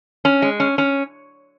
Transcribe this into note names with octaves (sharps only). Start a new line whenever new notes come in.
C#4
G#3
C#4
C#4